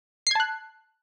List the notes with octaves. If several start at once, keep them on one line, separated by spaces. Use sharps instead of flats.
A5 F#6 G#6 C7